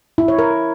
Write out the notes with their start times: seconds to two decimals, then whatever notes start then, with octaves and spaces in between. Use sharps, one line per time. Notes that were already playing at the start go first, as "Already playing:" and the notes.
0.18 E4
0.28 C#5
0.39 A#4